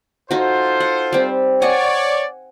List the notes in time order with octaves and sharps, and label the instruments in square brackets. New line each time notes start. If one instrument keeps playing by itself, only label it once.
[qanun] D#4 F#4 [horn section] F4 A4 C5
[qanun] F#5
G3 C4
[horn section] C#5 D5 [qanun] F#5 G#5 C#6